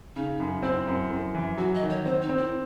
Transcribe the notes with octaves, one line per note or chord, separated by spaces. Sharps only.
C#3 D#4
F#2
C4 E4
F#2
F#2
E3
F#3 F#4
D#5
D#3
C#5
C4 C5
D#4
C4
E4